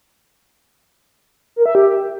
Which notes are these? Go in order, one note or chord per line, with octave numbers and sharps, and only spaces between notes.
A#4
E5
G4